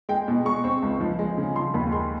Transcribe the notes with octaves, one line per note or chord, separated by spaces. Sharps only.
G#3 G5
B2
G#3 C#6
C4
C#2
F3
G#3
C#3
F3 C6
D#2 B5
G#3 C6